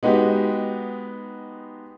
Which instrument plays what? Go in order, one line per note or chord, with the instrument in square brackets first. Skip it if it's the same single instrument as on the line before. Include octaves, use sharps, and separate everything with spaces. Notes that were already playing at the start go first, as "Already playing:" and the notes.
[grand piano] G#3 B3 D#4 F#4 G4